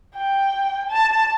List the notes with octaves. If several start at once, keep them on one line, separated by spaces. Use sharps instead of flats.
G5
A5